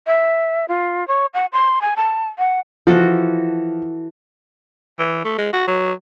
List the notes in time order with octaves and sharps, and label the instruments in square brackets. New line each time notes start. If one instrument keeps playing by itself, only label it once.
[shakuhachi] E5
F4
C#5
F#5
C6
G#5
A5
F#5
[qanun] E3 F#4 A4 [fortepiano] F3
[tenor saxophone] E3
A3
G#3
F#4
F#3